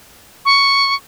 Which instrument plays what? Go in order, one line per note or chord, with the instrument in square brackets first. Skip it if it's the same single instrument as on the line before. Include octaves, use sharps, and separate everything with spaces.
[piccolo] C#6